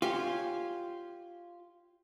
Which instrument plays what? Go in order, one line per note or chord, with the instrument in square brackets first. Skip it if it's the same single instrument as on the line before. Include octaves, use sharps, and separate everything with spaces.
[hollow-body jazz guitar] F4 [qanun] G4 C#5 G#5